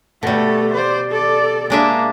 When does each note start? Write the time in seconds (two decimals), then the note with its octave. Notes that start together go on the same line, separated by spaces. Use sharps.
0.23 B2 G3 A3 A4
0.73 C5 D5
1.11 A4 D5
1.70 G#3 A#3 D4 E5